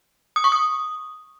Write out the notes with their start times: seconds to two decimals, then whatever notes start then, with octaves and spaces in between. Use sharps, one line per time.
0.36 D#6
0.44 C#6
0.52 D#6